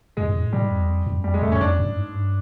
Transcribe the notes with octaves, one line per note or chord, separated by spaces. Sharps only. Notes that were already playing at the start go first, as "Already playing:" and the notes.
F2 G#3
F2
A2
A2 G3
G#2
F2
E2
F2
F2
F#2
F2 G3
G#3
F2 A3
F#2 C#4
F2 D4
F#2
G#2
G2